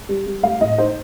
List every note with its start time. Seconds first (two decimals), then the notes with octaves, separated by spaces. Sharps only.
0.09 G3
0.26 G3
0.43 A3 F5
0.60 A2 D#5
0.78 D#4 C5